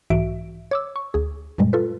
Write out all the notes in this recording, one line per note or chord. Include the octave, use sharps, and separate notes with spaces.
B1 G#2 E3 F#4 E5 D7
C#5 D6 E6
C#6
D2 G#4
F#2 A#2 G3 G#3
F4 A4 B4